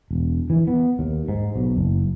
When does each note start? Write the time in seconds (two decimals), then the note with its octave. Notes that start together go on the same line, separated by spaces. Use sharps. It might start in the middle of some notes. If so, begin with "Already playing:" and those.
0.11 E1
0.50 E3
0.67 B3
0.99 D#2
1.29 G#2
1.56 B1
1.76 F#1